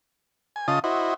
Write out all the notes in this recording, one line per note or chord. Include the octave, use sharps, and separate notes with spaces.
G#5
C#3 F4 D#5 A5 D#6
E4 F#4 C5 D#5